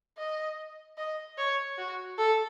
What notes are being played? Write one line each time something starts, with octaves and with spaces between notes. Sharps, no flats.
D#5
D#5
C#5
F#4
A4